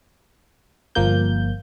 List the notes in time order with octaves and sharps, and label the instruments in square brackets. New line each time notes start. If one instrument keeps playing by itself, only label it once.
[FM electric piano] G1 F3 A#3 G6